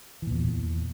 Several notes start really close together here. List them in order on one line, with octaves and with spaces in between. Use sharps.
E3 A#2 E2